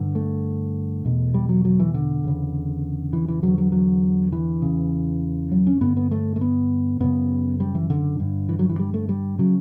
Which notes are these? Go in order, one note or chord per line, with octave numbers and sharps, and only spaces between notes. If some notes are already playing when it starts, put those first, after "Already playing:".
Already playing: G2 D3
A3
E2 B2
G3
F#3
F#3
E3
D3
E2 C#3
E3
E3
E2 D3 F#3
F#3
F#3
E3
E2 C#3
F#3
C#4
G2 D3 B3
B3
A3
A3
B3
F#2 C#3 B3
G3
E3
D3
G2 D3
E3
F#3
E3
G3
A3
G3
C#3 F#3